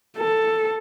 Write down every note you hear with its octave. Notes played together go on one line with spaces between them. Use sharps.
A4